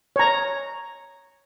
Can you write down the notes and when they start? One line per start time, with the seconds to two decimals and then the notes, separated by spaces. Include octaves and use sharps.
0.16 C#5 A#5